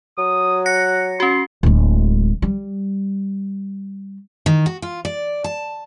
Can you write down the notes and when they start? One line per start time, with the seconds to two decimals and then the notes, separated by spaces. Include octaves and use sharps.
0.18 F#3 D#6
0.66 F#5 A#6 C#7
1.20 C#4 F#4 C6
1.63 D1 G#3
2.42 G3
4.46 D#3
4.66 F#4
4.82 F4
5.05 D5
5.44 A5